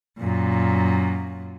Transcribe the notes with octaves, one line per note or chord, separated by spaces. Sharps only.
F#2 A#2